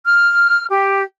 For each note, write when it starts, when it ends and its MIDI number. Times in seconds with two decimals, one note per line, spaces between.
0.04 0.65 89
0.69 1.02 67